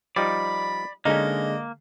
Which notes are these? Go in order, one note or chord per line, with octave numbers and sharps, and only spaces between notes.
F3 G3 D#4 D5 B5
D3 G#3 A#3 C#4 D#4 D#5